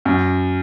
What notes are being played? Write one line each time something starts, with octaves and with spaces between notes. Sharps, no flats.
F#2